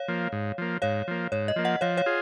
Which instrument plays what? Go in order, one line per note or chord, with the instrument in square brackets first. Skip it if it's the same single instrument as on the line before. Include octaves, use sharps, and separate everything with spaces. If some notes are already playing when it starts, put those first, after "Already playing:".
Already playing: [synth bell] C#5 F5
[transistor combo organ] F3 A#3
G#2
F3 A#3
[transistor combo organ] G#2 [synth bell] C#5 F5
[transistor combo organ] F3 A#3
[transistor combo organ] G#2 [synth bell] C#5
[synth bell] D#5
[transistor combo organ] F3 A#3
[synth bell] D#5 F#5
[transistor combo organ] F3 [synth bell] C#5 F5
[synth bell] C#5 F5
[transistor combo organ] F4 G#4